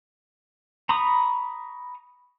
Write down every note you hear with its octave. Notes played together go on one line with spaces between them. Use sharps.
A#5 B5 C#6 D#6